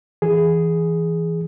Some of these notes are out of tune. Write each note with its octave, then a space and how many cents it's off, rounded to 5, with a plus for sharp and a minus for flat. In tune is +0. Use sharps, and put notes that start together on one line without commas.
E3 +0 G#4 +0